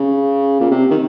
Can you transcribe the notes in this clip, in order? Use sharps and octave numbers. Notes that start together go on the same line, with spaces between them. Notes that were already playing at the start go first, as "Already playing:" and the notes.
Already playing: C#3
A#2
C3
D#3